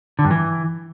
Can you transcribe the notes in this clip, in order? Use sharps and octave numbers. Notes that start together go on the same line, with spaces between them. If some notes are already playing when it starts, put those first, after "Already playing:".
D3
G2
E3